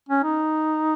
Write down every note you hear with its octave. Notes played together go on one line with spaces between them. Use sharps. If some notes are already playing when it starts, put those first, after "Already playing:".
C#4
D#4